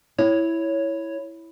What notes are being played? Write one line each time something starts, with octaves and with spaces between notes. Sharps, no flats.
E4 C#5